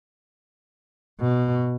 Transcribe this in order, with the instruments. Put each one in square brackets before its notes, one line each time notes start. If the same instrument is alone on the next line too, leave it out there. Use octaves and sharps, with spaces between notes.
[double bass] B2